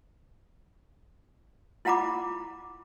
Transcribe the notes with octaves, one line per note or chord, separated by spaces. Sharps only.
E4 F4 F#5 A#5 B5 D6